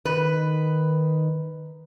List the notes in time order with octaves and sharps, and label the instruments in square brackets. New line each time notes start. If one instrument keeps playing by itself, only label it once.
[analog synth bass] D#3 [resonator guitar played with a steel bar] B4